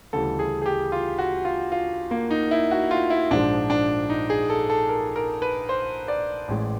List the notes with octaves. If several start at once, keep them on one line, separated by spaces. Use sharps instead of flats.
D2 C#3 E3 G3 A4
G#4
G#4
G4
F4
F#4
F4
F4
A#3
D#4
E4
F#4
F4
E4
A#1 G#2 F3 G#3 D4
D4
D#4
G#4
A4
A4
A#4
A#4
B4
C5
D5
A1 A2 E3 G#3